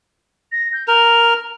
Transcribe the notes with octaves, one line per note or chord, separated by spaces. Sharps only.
A#6
G6
A#4 F7